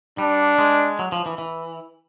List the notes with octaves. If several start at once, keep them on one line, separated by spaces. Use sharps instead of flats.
G3 D4
G#3
F#3
F3
E3
E3